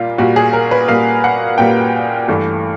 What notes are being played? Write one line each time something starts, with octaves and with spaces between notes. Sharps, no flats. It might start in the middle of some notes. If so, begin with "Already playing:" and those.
Already playing: A#2 G3 A#3 F4
A#2 G3 A#3 F#4
G#4
A#4
B4
A#2 G3 A#3 F5
F#5
A#2 G3 A#3 G5
G2 E3 A3